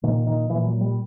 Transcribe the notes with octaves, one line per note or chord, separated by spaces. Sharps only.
A#2 D#3
D#3
A#2 E3
F#3
G3